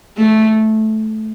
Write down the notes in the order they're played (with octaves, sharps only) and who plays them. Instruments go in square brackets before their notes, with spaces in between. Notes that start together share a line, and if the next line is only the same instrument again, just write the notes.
[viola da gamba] A3